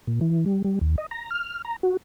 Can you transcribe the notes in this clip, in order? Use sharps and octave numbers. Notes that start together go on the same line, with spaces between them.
A#2
E3
G3
G3
D#2
D#5
A#5
F6
A#5
F#4